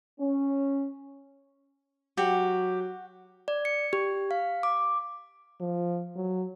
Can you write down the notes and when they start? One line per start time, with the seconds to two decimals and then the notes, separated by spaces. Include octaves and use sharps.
0.20 C#4
2.17 F#3 F#4 G4
3.48 D5
3.65 C#7
3.93 G4
4.31 F5
4.63 D6
5.60 F3
6.16 F#3